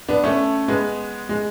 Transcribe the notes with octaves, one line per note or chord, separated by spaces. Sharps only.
B3 D4
A3 C#4
G#3 B3
G#3